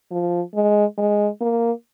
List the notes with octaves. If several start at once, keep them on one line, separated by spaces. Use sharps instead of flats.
F3
G#3
G#3
A#3